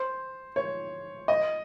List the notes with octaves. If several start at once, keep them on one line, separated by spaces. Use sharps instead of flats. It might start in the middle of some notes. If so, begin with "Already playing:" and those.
Already playing: C5
C#5
D#5